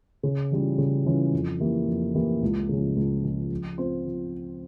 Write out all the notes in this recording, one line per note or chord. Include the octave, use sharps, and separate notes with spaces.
C#3
E3 G3 C#4 F4
C#3
E3 G3 C#4 F4
F2
E3 A#3 E4 G4
F2
E3 A#3 E4 G4
C#2
C#3 F3 G#3 C#4
C#2
C#3 F3 G#3 C#4
F3
C4 F4 C5
F3